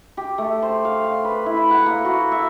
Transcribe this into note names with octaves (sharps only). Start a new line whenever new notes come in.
G4
A3
C5
F5
F5
B4
E4
F#5
A#3
F#4
E5